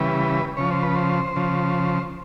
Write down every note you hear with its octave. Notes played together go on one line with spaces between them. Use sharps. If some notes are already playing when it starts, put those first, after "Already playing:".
Already playing: C#3 E3 G3 B4
C#3 F3 C#5
C5
B4
C5
C#3 F3